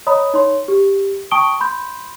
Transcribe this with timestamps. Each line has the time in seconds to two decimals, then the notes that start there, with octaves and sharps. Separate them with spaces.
0.06 C#5 D#5 A#5 B5 D#6
0.34 D#4 C#5 C6
0.68 G4
1.31 G5 A5 C#6 D#6 D7 G7
1.60 B5 C6 G6